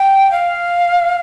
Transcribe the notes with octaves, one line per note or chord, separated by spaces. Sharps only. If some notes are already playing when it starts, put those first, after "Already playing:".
Already playing: G5
F5